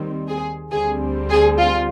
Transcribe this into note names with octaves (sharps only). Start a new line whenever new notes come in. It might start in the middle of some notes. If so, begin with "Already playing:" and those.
Already playing: D#2 D#3 G3 C4
G#4
D2 D3 G3 C4 G#4
G#4
F4